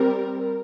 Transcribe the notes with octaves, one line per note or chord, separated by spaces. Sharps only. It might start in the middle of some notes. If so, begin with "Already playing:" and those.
Already playing: G3 C4 A#4